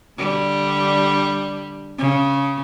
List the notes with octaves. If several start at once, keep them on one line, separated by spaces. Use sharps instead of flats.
D3 G3
C#3